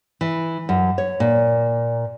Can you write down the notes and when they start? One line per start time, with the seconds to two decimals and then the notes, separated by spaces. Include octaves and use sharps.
0.21 E3
0.69 F#2
0.98 C#5
1.20 A#2